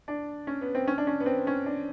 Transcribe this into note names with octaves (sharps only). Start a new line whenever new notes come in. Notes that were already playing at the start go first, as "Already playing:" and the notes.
D4
C#4
B3
C4
C#4
D4
C#4
B3
C4
C#4
D4